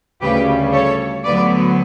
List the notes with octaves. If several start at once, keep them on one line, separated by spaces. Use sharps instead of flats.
D2 C#3 G3 G4 B4
A4 C#5
D2 D3 F#3 B3 B4 D5